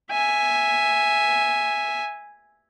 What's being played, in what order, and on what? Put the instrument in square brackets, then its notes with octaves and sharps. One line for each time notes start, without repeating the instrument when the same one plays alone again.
[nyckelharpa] E5 G#5